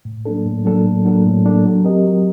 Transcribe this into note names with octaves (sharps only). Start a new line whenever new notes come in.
A2
F#3 A#3 D4 A4
A2
F#3 A#3 D4 A4
A2
F#3 A#3 D4 A4
A2
F#3 A#3 D4 A4
F#3
C4 G4 A#4 D#5
F#3